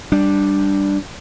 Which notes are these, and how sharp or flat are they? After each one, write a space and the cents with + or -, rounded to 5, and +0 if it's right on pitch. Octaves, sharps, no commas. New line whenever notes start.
G3 +0 D4 +0